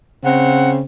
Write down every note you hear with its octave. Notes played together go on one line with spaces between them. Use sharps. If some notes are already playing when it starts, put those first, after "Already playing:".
C#3 C4 F#5